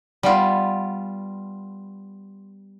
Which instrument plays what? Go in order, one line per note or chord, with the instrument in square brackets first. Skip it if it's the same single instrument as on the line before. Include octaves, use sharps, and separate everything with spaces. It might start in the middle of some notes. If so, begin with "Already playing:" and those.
[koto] G3 B3 F4